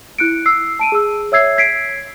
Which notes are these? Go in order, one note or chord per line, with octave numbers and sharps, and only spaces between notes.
E4 F#6 C#7 D7
E6 C7
A5 D7 D#7
G#4 E6
C#5 E5 E6 G#6 C7
G#6 B6 C7 D7